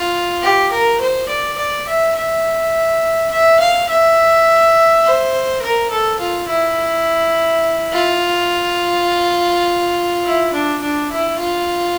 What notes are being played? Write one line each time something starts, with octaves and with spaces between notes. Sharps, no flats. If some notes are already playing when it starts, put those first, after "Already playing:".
Already playing: F4
G4
A#4
C5
D5
D5
E5
E5
E5
F5
E5
C5
A#4
A4
F4
E4
F4
E4
D4
D4
E4
F4